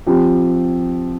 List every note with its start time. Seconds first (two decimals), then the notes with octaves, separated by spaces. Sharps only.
0.06 F3 C4 G4